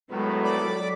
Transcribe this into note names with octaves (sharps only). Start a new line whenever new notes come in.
A2 D#3 F#3 G#3 B3 A4
D5 B5 D6